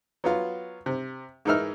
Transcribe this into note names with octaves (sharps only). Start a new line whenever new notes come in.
F#3 B3 F4
C3
G#2 E3 D#4 A#4 E5 F6